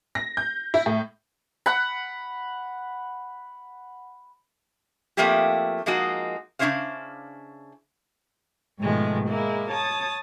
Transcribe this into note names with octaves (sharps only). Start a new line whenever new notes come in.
A#6
G6
E4
A2
F#5 B5
F3 A3 A#3 C4 E4 G4
F3 G#3 A#3 D#4 F#4
C#3 F3 D4 E4 C5 F5
G#2 B2 D#3 F3 G#3 A3
G#3 A#3 E4
C#5 A5 D#6